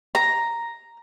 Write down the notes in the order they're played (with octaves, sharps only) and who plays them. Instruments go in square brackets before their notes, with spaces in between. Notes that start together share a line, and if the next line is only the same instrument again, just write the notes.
[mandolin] A#5